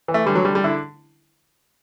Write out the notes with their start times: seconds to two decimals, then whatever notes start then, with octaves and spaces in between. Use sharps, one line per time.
0.08 E3
0.14 A3
0.26 D3 G3
0.35 F#3
0.45 D3 G3
0.55 G3
0.64 D3 E4